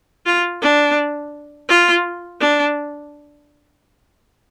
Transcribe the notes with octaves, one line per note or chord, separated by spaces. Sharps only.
F4
D4
F4
D4